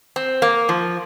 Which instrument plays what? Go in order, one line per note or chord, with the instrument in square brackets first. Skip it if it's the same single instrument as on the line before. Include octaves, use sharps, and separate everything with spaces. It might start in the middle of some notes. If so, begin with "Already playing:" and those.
[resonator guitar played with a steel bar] C4
A#3
F3